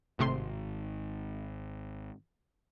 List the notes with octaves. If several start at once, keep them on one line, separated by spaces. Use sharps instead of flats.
G#1 A2 C3 C6